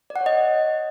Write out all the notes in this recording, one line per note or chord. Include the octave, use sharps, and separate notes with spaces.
D5
F#5
C#5
D#5